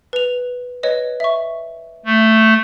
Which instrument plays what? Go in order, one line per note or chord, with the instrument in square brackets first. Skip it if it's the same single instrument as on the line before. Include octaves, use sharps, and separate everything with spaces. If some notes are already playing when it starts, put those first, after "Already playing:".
[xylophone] B4 F7
B4 C#5 D#5
E5 C#6
[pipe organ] A3